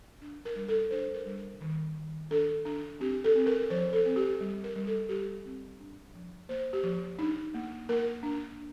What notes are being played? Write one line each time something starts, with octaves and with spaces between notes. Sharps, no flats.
D4
A#4
G3
A4
D4 C5
A#4
G3
A#4
D#3
D#3
D4 A4
D4
C4 G4
A4
C4
A#4
F3 C5
A4
C4
G4
G3
A#4
G3
A4
G3 G4
C4
D4
F3
A#3 C5
G4
F3
D4 D#4
A#3
A#3 A#4
D4